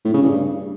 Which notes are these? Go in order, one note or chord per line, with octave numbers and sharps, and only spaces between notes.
A2
C#3
G2